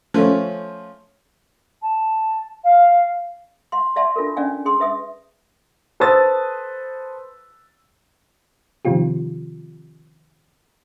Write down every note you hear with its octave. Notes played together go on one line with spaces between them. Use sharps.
F3 A3 C#4
A5
F5
F5 C6
D5 E5 F5 A5 C6
D4 F4 A4 A#4
C#4 D4 D5 F5 G#5
G#4 C6 D#6
B4 E5 D#6
A4 B4 C5 D#6 E6 A6
C3 D#3 F3 C4 F4 G4